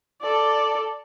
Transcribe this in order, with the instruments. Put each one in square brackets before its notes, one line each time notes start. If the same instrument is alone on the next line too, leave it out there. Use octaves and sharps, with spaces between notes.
[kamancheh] A4 D5